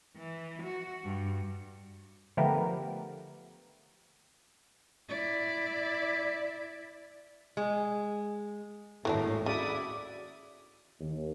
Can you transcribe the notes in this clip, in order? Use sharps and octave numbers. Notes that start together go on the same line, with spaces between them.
E3
F#4
G2
D3 F3 A3 B3 G4 A#4
E4 D5
G#3
G#1 D#2 A2 E3 F#3 D4
C#3 E4 F#4 D5 D#6
D#2